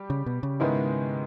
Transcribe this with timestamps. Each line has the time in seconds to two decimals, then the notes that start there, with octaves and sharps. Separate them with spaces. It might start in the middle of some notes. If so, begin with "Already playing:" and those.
Already playing: G3 G4
0.10 C#3
0.26 B2
0.43 C#3
0.60 G#2 D#3 G#3 B3 E4